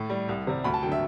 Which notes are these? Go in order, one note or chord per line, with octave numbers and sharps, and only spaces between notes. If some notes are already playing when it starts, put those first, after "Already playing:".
Already playing: A2
G3
C2
C3 G3
D2 B5
A5
D3 F#3 G5
E5